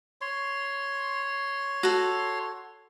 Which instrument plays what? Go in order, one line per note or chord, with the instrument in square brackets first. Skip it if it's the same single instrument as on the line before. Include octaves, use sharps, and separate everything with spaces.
[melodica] C#5 C6
[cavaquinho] F#4 A4